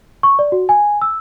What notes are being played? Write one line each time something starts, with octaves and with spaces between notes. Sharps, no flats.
C#6
D5
F#4
G#5
E6